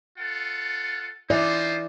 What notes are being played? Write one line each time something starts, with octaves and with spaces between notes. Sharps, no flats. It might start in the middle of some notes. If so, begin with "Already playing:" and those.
F4 A4 F#5
E3 D#4 F4 C5 D5